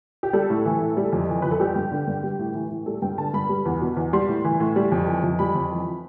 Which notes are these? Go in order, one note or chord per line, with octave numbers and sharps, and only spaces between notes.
G4
G3 A4
A2
E3
A2
G3
F2
E3
F2 B4
A4
G3 G4
G2
D3
G2
G3
A2
E3
A2
G3 A4
G2 G5
D3 A5
G2 B5
G3
E2
B2
E2
G3 C6
A2
E3
A2
G3
F2
E3
F2
G3 B5
F2
E3